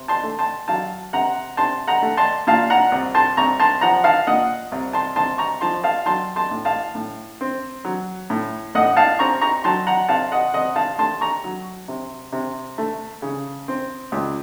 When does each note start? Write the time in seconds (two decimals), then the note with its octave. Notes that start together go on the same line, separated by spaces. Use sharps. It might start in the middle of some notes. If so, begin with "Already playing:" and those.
Already playing: C3
0.08 A5 C6
0.23 A3
0.39 A5 C6
0.68 F#3 F5 A5
1.13 C3 F#5 A#5
1.57 C3 A5 C6
1.88 F#5 A#5
2.02 A3
2.17 A5 C6
2.47 A#2 F5 A5
2.70 F#5 A#5
2.92 C2
3.15 A5 C6
3.37 C2 A#5 C#6
3.60 A5 C6
3.81 F3 F#5 A#5
4.04 F5 A5
4.27 A#2 D#5 F#5
4.72 C2
4.93 A5 C6
5.16 C2 A5 C6
5.38 A#5 C#6
5.61 F3 A5 C6
5.84 F5 A5
6.06 F#3 A5 C6
6.36 A5 C6
6.51 A2
6.65 F5 A5
6.95 A2
7.41 C4
7.85 F#3
8.30 A2
8.75 A2 D#5 F#5
8.97 F5 A5
9.19 C4 A#5 C#6
9.41 A#5 C#6
9.64 F#3 A5 C6
9.87 F#5 A#5
10.09 C3 F5 A5
10.32 D#5 F#5
10.54 C3 D#5 F#5
10.76 F5 A5
10.98 A3 A5 C6
11.21 A#5 C#6
11.44 F#3
11.88 C3
12.33 C3
12.78 A3
13.22 C#3
13.68 C4
14.12 C#2